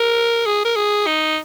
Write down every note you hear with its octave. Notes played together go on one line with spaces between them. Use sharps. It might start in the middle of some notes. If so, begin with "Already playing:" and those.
Already playing: A#4
G#4
A#4
G#4
D#4